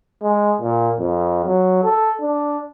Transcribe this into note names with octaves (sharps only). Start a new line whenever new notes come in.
G#3
A#2
F2
F#3
A4
D4